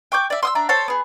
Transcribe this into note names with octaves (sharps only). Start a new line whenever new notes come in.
G5 C#6 D6 G6
D5 E5
C6 D#6 E6
D4 E5 A#5
A4 C5 C#5 A5
B3 G#4